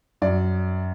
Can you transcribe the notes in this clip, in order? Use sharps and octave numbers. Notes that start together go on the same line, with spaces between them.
F#2 D5